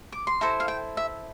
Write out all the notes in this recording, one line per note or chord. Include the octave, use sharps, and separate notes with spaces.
D6
C6
E4 A4 C5 A#5
F5
G5
E5